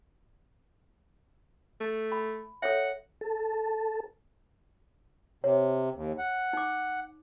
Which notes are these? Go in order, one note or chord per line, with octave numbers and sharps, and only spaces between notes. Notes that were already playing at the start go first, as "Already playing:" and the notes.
A3
B5
A4 C#5 E5 F#5
A4
C3 C#5
D#2
F#5
D#4 D6